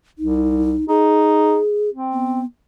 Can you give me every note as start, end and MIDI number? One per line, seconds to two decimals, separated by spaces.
0.19 0.78 36
0.19 0.85 63
0.89 1.59 63
0.89 1.89 68
1.94 2.41 60
2.13 2.45 59